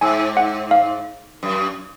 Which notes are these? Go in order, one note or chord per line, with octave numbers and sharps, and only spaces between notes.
G#2 G#5
F#5
F5
F#2